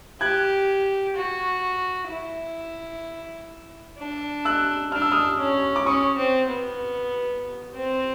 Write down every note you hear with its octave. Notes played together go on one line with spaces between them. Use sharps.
G4 F#6 G#6
F#4
E4
D4
E6 F#6
D4 F6
E6
D#6 F6
C#4
D6
C#4 C#6 D#6
C4
B3
C4